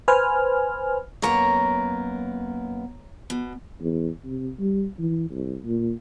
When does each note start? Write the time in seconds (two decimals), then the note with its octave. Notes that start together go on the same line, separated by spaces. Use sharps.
0.08 B4 C5 G#5 F6
1.22 F#2 A#3 B3 C#5 A#5
3.30 B2
3.81 E2
4.25 C3
4.60 G3
4.99 E3
5.31 C2
5.65 A#2